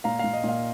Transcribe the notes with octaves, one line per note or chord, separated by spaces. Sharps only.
A#2 F5 A#5
A#2 F5
D#5
A#2 F5